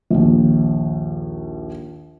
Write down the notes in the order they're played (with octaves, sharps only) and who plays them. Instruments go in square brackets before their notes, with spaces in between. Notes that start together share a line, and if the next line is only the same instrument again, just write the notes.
[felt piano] A#1 D#2